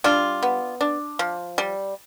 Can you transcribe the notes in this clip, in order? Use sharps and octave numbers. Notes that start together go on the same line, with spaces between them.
G3 D4 F4
B3
D4
F3
G3